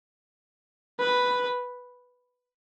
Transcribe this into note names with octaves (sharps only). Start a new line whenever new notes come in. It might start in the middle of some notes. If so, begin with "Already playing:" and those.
B4